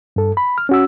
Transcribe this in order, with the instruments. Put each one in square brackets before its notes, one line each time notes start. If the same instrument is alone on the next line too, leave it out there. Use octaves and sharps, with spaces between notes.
[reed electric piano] G2 A4
B5
F6
C#4 F#4 E6